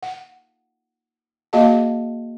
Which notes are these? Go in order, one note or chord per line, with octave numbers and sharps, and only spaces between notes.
F#5
A#3 F#4 G#4 D#5 F5 A5